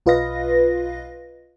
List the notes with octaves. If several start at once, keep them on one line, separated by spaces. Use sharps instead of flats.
B1 F4 B4 D#5 F5 A#6